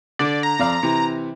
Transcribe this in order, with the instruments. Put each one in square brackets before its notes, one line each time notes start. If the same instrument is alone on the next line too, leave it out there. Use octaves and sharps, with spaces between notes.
[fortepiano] D3 [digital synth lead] D5
[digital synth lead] A#5
[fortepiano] F2 D5 F5
C3 E3